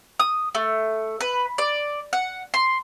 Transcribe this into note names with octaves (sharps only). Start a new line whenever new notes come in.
D#6
A3
B4
D5
F#5
C6